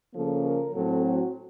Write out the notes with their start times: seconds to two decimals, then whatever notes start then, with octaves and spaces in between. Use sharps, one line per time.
0.15 C#3 F3 A#3 C#4 A4
0.45 A#4
0.74 A2 F#3 C4 A4
1.04 F#4